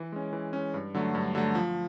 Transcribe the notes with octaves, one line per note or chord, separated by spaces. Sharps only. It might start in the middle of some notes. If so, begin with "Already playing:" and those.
Already playing: E3
G#3 C#4
E3
G#3 C#4
G2
D3 F#3 A3
G2
D3 F#3 A3
F3